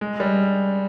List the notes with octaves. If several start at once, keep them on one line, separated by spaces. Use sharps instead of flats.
G#3
G3